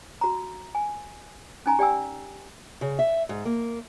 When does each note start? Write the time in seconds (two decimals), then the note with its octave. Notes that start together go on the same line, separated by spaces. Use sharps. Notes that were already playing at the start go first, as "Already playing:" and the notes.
0.21 F#4 A#5
0.75 G#5
1.66 C#4 D#4 G#5 A#5
1.79 G4 D5 G5 G#5 E6
2.81 C#3
2.99 E5
3.29 G#2
3.45 A#3